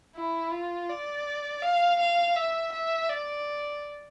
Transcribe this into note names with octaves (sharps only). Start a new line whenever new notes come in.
E4
F4
D5
F5
F5
E5
E5
D5